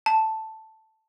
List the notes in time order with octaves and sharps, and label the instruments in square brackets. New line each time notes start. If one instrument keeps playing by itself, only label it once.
[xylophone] A5